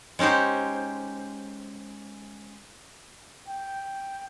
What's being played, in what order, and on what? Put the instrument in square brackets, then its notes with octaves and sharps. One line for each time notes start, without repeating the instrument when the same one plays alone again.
[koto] G#3 C#4 D#4 G4 C5
[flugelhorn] G5